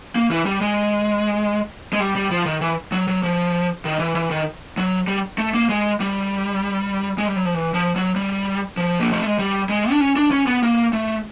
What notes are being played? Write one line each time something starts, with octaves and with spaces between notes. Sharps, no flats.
A#3
E3
G3
G#3
G#3
G3
G3
F3
D#3
E3
F#3
F#3
F3
D#3
E3
E3
D#3
F#3
G3
A3
A#3
G#3
G3
G#3
G3
F#3
F3
E3
F3
F#3
G3
F3
A#3
A3
G#3
G3
G#3
D4
C#4
D4
C#4
B3
A#3
A3